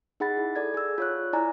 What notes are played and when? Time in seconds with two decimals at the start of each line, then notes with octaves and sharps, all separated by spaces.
0.20 D#4 G#4 F#5 B5 A6
0.37 E4
0.56 A4 D5 G#6
0.74 G#4 E6
0.98 F4 C#5 F#6
1.33 E4 D5 G#5 A#5